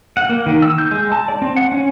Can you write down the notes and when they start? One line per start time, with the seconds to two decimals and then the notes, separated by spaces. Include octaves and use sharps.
0.17 F#5
0.29 A#3
0.46 D#3
0.62 E6
0.78 G6
0.91 G#3
1.12 A5
1.28 D5
1.42 C4
1.56 F#5
1.72 C#4